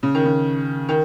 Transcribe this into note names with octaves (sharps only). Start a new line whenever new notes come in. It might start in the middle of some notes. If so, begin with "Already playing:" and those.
C#3
D#3
C#3
D#3